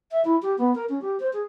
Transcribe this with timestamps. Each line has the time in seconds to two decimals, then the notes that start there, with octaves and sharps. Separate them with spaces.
0.12 E5
0.25 E4
0.42 G4
0.58 B3
0.75 A#4
0.89 C#4
1.02 G4
1.20 C5
1.33 G#4